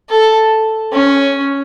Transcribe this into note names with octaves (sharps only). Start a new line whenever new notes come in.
A4
C#4